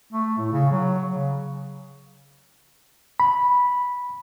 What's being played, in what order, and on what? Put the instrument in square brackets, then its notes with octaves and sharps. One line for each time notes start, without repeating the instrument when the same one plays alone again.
[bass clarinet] A3
A2
C#3
F#3
C#3
[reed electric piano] B5